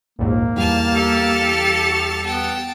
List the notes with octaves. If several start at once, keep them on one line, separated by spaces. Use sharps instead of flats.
A#1 D#2 G#2 A#3
E2 G3 F5 A5
G4 A4
B3 G5 A5